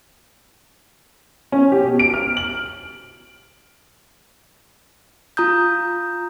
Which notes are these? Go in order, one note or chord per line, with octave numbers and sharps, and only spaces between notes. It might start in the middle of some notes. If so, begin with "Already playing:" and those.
C#4
G4
B2
D7
F6
F#7
F4 A#5 D#6 G6